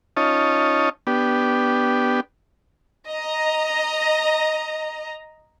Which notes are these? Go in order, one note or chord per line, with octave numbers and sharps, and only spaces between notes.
C#4 D#4 F4 C#5 D#5 A5
B3 D4 G4
D#5 A#5